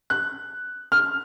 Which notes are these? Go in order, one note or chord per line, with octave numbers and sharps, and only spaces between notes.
F#6
F6